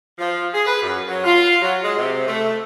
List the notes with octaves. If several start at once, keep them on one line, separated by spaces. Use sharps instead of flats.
F3
G#4
B4
F#2
F#3
F4
F#3
G#3
C3
A3